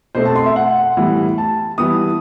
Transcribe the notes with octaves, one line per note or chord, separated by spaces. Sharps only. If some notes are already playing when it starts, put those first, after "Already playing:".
B2 A3 C4 C5
A5
C6
E5
F#5
A2 E3 G3 B3
A5
E3 G3 B3 D#6